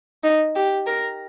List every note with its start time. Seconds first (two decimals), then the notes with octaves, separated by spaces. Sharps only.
0.24 D#4
0.56 G4
0.87 A#4